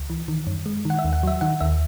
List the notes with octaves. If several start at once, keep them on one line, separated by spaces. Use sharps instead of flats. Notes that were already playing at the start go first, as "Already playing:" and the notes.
Already playing: C#2
E3
D#3
F#2
G#3
D#3 F#5
E5
D#2
F#5
F#3 E5
D#3 F#5
D#2 E5